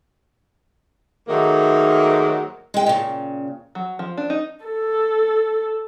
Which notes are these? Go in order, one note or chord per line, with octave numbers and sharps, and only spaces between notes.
G#2 D#3 F#3 A3 A#3
G#3 G5
A#2 C#3
F#3
F3
D4
D#4
A4